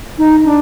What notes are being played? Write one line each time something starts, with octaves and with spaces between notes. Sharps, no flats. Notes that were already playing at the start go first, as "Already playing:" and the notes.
D#4
D4